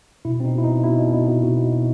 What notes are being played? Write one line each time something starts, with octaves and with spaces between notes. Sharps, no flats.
B2 E4
B2 C4
D#4
B2 E4
D#4
B2
B2 E4
B2
B2
B2
B2
B2
B2